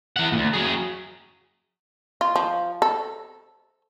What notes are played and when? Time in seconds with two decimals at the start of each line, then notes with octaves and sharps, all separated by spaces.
0.16 E3 F#5
0.32 D2 A#2
0.53 F#3 G#4
2.21 F4
2.36 F3
2.82 A4